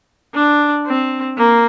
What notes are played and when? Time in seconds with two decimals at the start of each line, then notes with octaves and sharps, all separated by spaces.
0.34 D4
0.86 C4
1.38 A#3